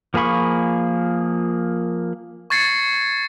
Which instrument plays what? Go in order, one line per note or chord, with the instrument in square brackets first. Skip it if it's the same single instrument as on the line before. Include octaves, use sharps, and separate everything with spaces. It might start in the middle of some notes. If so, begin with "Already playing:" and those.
[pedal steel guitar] F3 A#3 G#4 B5 C#6
[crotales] C#6 G#6 A6 C7 C#7